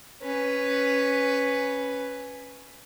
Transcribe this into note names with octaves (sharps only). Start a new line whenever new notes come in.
C#4 B4